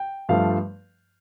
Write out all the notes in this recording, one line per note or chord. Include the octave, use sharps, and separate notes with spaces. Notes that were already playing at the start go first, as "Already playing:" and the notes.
Already playing: G5
G2 F3 A3 F5